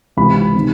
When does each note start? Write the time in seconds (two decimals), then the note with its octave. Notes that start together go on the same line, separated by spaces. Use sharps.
0.17 C#2 C3 E3 B5
0.55 C3 D#3